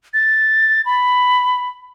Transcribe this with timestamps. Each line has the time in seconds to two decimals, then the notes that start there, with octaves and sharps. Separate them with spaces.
0.14 A6
0.86 B5